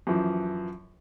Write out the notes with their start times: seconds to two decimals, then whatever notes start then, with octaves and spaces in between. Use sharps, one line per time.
0.07 F#2 E3 F3